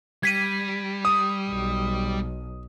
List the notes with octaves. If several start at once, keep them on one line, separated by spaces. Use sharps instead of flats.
G3 G#6 B6 D#7
D#6
B1